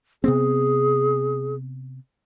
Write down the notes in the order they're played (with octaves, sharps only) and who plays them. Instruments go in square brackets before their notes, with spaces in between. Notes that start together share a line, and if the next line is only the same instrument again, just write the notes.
[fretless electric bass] C3 B3 C4 [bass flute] G#4